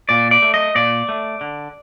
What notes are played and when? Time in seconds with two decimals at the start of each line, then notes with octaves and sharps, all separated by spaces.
0.09 A#2 D5
0.31 D5
0.42 A3
0.54 D#5
0.75 A#2 D5
1.09 A3
1.41 D3